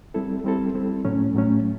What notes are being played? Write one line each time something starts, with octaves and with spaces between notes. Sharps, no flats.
G3 C4 E4 A4
G3 C4 E4 A4
G3 C4 E4 A4
A2 F#3 A3 C#4
A2 F#3 A3 C#4